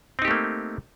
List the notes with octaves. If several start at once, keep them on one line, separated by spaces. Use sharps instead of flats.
A3 A#3 C4 D#4 G4